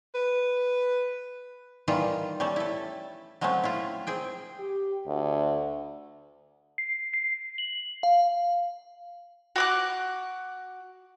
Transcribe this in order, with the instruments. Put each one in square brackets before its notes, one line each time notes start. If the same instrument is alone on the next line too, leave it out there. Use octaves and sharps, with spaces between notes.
[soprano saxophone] B4
[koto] D#3 E3 G3 F4
G3 A3 C#4 A4
E4 A4
F#3 G#3 A3 C4 C#4 F4
E4 F4
C4 G#4 G5
[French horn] G4
D2
[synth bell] C7
C7
F#7
F5
[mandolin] F#4 D6 F#6